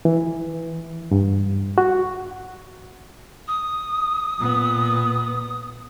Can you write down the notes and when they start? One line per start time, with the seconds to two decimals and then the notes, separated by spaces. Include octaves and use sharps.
0.05 E3
1.11 G2
1.78 F#4
3.48 D#6
4.38 A#2 B3